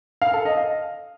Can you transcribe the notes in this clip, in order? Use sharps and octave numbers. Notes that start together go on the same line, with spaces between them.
F5
A4
D#5
F5